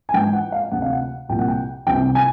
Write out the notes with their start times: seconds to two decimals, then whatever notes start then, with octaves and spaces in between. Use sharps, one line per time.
0.09 G#5
0.14 G#2 E3 G5
0.33 F#5
0.52 F5
0.71 D2 C3 E3 F#5
0.82 F5
0.93 F#5
1.29 C2 A#2 F3 G5
1.39 F#5
1.48 G5
1.87 C2 C3 E3 G5
2.15 G#5